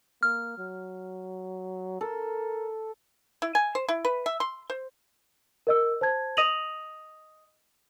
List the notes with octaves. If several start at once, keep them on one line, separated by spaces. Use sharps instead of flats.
A#3 F6
F#3
A4 A#4
E4
G#5
C5
E4
B4
E5
C6
C5
A#4 D#5 E6
C5 A5 G#6
D#5 D#6 A#6 D#7 F7 F#7